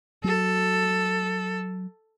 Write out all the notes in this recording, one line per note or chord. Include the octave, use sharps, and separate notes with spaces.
F#3 A4